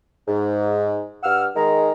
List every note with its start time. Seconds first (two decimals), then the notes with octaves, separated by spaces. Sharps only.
0.28 G#2
1.23 G2 F#5 E6 F6
1.56 D#3 G#3 A#5